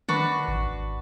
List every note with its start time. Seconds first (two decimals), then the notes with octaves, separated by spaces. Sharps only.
0.09 D#3 D4 F#4 B4
0.48 G#1